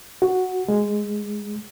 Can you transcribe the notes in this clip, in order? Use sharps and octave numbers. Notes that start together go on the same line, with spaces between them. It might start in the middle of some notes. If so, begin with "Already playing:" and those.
F#4
G#3